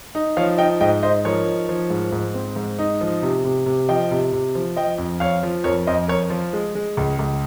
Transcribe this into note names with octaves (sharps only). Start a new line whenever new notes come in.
D#4
F3 C#5 F5
D#4 D#5 G5
G#2 D#5 G5
D#4 C5 D#5
F3 A#4 C#5
D#4
F3
G#2
G#2
C4
G#2
D#4
F3
C3
C3
C3
F3 D#5 G5
C3
C3
F3
F3 D#5 G5
F2
F2 C#5 F5
F3
F2 A#4 C#5
F2 C5 D#5
F2 A#4 C#5
F3 F4
G#3
G#3
C#2
C#2